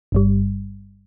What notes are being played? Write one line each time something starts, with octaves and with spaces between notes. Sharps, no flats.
G1 G2 G3